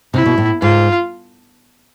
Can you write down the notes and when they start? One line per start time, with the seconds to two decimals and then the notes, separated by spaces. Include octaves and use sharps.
0.14 C3 E4
0.26 B2
0.38 A2
0.61 G#2 F4